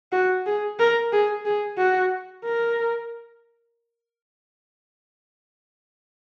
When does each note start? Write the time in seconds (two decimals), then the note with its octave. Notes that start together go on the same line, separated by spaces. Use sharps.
0.12 F#4
0.46 G#4
0.79 A#4
1.12 G#4
1.45 G#4
1.78 F#4
2.45 A#4